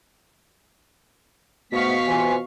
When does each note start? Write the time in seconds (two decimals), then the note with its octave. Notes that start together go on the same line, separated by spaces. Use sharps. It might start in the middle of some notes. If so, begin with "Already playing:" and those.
1.73 G#2 B2 A3 B3 F5 C#6 B6
2.08 C3 E3 F4 G#5